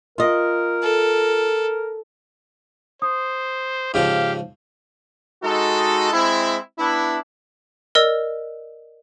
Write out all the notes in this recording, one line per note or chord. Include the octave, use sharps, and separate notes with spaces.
F4 A#4 D#5
A4
C5 D#6
G#2 C#3 F3 G4 F5
G#3 D#4 F#4 A4
G#3 C4 E4
B3 D4 E4
A#4 D5 D#5 E6